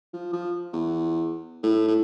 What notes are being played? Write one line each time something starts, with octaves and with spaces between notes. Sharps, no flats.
F3
F3
E2
A2
A2